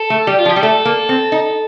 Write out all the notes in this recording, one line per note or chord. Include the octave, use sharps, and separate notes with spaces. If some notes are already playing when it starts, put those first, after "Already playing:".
Already playing: A4
A3
G3 G4
F4
F3
G4
G3
A3 A4
A#3
C4
D#4